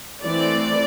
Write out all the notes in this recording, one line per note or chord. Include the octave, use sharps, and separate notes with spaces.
E3 A3 C4 D5